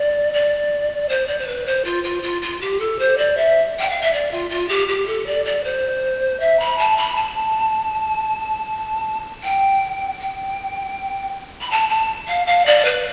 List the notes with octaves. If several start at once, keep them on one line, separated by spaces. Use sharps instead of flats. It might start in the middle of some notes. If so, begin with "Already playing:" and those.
Already playing: D5
D5
C5
D5
C5
B4
C5
F4
F4
F4
F4
G4
A4
C5
D5
E5
G5
F5
E5
D5
F4
F4
G4
G4
A4
D5
D5
C5
E5
B5
A5
B5
A5
G5
G5
B5
A5
A5
F5
F5
D5
B4